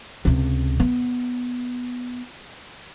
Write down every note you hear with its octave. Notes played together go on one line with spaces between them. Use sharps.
C#2 C3
B3